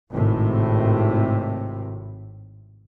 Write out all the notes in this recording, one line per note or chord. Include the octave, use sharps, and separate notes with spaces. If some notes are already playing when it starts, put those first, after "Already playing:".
G#1 A2 C3